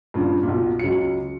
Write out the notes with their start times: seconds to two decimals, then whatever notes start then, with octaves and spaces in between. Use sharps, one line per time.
0.14 G2 A#2 C#3
0.43 B1 A#2
0.79 C#2 F#3 C#7